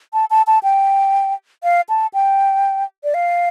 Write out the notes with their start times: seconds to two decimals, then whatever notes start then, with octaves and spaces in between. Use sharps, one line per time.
0.13 A5
0.30 A5
0.47 A5
0.63 G5
1.64 F5
1.89 A5
2.14 G5
3.04 D5
3.14 F5